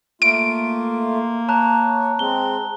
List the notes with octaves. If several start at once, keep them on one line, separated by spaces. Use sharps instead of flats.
A3 A#3 F4 D7
C#5 A5 A#5 F#6
G#3 C4 G7